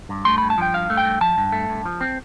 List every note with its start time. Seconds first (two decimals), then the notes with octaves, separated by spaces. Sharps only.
0.09 G2
0.25 A3 C6
0.38 G2 B5
0.50 A5
0.58 F3 G5
0.73 G2 F5
0.90 A3
0.97 G5
1.05 G2
1.21 F3 A5
1.38 G2
1.52 A3
1.69 G2
1.86 F3
2.01 C4